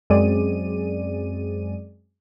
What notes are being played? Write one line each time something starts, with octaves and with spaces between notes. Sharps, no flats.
F#2 G#3 C4 G#4 D5 D#7